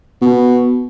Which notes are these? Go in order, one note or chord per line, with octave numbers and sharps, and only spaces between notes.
B2